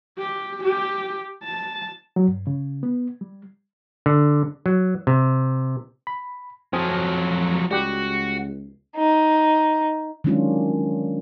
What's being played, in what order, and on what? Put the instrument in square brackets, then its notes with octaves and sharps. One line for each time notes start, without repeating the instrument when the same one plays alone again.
[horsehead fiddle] G4
G4
A5
[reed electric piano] F#3
G2
C#3
B3
G3
[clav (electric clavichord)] D3
F#3
C3
[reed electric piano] B5
[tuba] F2 [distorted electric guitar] F3 F#3 [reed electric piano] C4 G#5 D#6
[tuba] C#2 [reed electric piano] G3 G4 F#6 [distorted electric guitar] F#4
[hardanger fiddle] D#4
[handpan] D#3 F#3 G#3 C#4 D4 F4